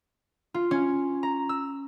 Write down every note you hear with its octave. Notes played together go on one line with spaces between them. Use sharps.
F4
C#4
A#5
E6